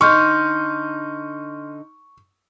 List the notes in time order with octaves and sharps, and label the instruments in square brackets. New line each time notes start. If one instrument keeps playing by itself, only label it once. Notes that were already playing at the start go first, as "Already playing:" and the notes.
[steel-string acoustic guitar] D3 D#4 [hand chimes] C6 F6 G6 [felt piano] C#6